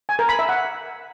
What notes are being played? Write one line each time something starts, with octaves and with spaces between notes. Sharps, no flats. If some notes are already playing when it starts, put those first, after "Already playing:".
G#5
A#4
B5
E5
F#5